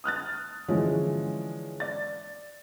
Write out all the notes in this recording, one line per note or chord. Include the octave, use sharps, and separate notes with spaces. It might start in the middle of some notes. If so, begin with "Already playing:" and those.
D#6 F6 F#6 A6
D3 E3 F3 G#3 C#4
D5 A6